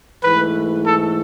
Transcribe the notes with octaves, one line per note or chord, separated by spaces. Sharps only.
G#2 E3 A3 B4
A4